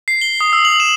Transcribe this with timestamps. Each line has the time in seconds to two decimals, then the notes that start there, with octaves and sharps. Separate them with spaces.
0.08 C7
0.21 G7
0.41 D#6
0.53 E6
0.65 F#7
0.80 E7